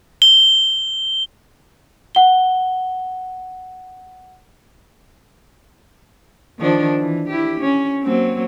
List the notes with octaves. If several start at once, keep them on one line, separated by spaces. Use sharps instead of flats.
G7
F#5 G7
D#3 F3 D4
E3
E4 G4
C#4
F#3 A#3 C4